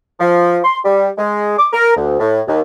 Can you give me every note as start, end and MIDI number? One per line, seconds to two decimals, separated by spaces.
0.20 0.59 53
0.64 0.78 84
0.84 1.09 55
1.18 1.56 56
1.58 1.67 86
1.73 1.92 70
1.96 2.18 38
2.20 2.41 45
2.48 2.60 39